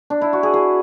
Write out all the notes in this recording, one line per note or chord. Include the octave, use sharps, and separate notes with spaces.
D4
E4
F#4
G#4
G#4